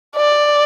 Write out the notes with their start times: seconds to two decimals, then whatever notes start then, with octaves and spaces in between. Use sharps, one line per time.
0.17 D5